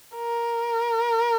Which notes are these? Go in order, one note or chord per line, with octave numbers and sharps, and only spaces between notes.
A#4